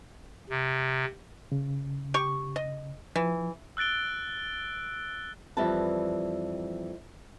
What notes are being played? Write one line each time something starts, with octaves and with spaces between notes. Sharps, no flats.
C3
C#3
G4 C#6
D#5
E3 F3
E6 F#6 A6 D7 G7
F2 E3 G3 E4 B4 A5